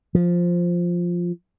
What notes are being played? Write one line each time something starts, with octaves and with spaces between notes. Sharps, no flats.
F3